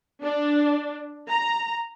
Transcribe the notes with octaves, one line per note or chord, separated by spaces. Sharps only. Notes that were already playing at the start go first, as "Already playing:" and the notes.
D4
A#5